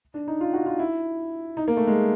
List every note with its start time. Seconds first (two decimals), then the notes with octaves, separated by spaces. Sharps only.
0.14 D4
0.28 D#4
0.40 F4
0.53 F#4
0.66 F4
0.79 E4
1.57 D#4
1.68 A#3
1.77 A3
1.87 G#3